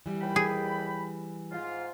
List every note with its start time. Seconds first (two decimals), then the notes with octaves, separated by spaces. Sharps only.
0.06 E3 G3
0.22 D#2 G5 B5
0.36 G#4
1.52 G#2 F4